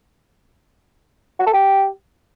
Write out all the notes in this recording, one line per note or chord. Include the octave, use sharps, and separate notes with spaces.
F#4
A4
G4